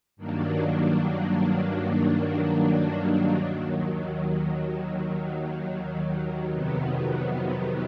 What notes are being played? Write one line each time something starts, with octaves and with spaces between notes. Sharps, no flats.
G2 D#3 F#3 A#3 D4
D#2 D#3 F#3
F2 C3 D#3 F#3 B3